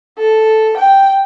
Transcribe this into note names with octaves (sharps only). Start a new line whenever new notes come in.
A4
G5